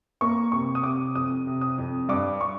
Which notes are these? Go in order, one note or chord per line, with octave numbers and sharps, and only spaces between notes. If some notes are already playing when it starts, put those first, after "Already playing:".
A#3 C#6
C3 C#6
D#6
C3 D6
F2 D#6
C3
D#6
F2
G2 D6
C#6